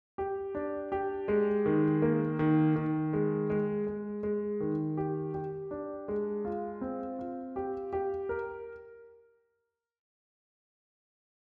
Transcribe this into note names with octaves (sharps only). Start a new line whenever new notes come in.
G4
D4
G4
G#3
D#3
A#3
D#3
D#3
G#3
G#3
G#3
G#3
D#3
G4
G4
D4
G#3
F4
C4
F4
G4
G4
A#4